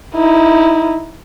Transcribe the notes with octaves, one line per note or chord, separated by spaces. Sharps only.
D#4 E4